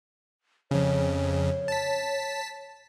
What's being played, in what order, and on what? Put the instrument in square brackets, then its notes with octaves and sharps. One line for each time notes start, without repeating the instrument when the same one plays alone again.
[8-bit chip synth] F2 C#3 [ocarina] C#5
[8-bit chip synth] A5 B6